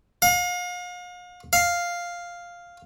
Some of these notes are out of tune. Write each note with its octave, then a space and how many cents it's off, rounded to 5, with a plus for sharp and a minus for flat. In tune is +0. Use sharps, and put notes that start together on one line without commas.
F5 +40
F5 +0